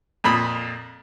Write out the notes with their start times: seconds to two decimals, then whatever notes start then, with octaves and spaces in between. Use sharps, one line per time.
0.24 F2 A#2 B5 D#6